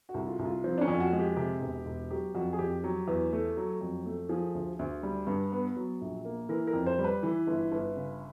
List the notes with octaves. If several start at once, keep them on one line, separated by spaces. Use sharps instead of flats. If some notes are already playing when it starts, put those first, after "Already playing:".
F#4
C2
F4
C2
F4
F3 C4
D4
C#4
F2
F#4
G#3
G4
C3 G4
E1
E1
F#3 G4
F2 F#4
G#4
F2 G4
F#3
E2
A3
F#3
F2
A3
F3 G#4
D2
D2
G3
G2
B3
F#3
A#1
A#3
E3 A#4
A#4
F2
C5
G3
B4
E3
G1
G1
C#3